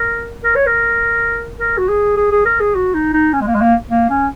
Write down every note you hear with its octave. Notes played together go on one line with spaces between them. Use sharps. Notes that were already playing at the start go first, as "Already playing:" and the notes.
Already playing: A#4
A#4
C#5
A#4
A#4
F#4
G#4
G#4
G#4
A#4
G#4
F#4
D#4
D#4
C#4
G#3
A#3
G#3
A#3
A#3
C#4